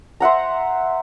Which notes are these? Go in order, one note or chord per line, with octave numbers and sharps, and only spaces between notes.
C5 E5 F#5 A#5